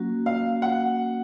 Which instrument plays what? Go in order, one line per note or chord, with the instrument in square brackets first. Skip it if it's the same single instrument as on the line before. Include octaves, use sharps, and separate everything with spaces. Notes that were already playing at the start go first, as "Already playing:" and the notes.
Already playing: [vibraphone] F#3 A#3 C#4 F#4
[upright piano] F5
F#5